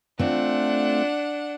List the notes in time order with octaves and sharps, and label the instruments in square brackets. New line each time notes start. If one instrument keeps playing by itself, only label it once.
[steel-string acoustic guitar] A3 C4 F4 [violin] D4 F#5